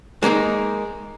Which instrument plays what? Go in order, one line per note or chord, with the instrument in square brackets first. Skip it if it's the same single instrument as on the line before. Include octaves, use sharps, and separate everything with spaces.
[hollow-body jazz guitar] G#3 A#3 C#4 D#4